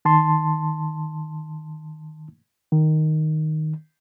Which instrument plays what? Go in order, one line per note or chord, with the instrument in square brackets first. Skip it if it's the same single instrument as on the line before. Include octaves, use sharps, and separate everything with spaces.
[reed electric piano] D#3 A5 C6
D#3